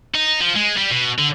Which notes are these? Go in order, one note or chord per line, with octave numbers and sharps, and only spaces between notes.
D#4
F3
G#3
G3
B2
D3